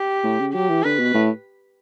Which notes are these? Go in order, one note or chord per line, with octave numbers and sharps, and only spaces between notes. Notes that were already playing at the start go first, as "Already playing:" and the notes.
Already playing: G4
A2
C#3
F#3 G4
E3
D3 B4
B2
A2